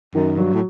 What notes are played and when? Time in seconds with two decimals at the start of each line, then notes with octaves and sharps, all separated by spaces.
0.15 F#2 D#3
0.37 G2 F#3
0.53 A2